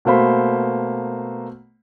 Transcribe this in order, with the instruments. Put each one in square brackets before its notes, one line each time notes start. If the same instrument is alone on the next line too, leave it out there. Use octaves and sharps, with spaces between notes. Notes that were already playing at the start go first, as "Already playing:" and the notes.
[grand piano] B2 A3 A#3 C5 B5